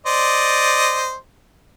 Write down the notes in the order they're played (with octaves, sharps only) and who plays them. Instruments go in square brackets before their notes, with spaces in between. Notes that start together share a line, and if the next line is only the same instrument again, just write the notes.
[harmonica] C5 D5 D#5